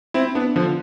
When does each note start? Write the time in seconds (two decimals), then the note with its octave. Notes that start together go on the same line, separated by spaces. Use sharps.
0.14 C4 E4
0.35 B3 D4
0.56 D3 F3